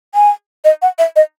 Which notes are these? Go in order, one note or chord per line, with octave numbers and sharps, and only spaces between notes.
G#5
D#5
F#5
E5
D#5